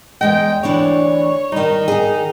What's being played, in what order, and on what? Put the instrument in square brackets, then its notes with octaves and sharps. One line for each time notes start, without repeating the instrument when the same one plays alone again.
[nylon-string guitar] E2 G#3 D#5 [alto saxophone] G5
[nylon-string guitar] D2 E3 D4 [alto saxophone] C#5
[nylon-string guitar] D#3 G3 [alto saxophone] D#4
[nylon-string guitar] D#3 G#4